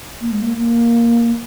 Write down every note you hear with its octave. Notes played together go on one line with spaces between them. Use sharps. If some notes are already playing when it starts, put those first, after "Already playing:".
A#3
G#3
A#3
A#3